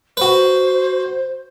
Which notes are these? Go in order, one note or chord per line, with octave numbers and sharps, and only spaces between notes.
F#4 B4 C5